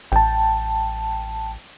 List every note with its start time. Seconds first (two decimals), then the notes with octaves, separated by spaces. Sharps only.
0.12 A1 G5 A5